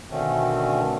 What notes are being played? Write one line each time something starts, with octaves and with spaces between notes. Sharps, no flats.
B2 D3 D#3 A3 C4 C#4